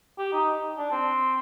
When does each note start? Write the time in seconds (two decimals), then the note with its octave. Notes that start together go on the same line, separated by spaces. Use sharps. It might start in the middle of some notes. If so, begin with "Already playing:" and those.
0.18 G4
0.32 D#4
0.77 D4
0.91 C4